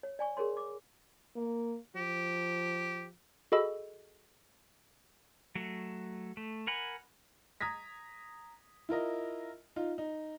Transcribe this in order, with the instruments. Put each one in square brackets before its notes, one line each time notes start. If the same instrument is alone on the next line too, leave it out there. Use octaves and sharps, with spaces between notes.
[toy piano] C#5
D5 G#5 C#6
G#4 A#4 C#5 C6
D6
[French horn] A#3
[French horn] F3 [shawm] G4
[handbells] F#4 G#4 A4 D#5 B5 E6
[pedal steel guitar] F#3 A3
A3
A#4 F#5 G#5 B5
[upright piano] A#5 D#6 G#6 A#6 B6
E4 F4 A#4 D#5
D#4 F4
D#4